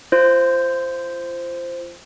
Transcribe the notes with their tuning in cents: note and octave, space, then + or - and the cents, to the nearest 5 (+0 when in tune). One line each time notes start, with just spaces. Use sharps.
F4 -30 C5 +0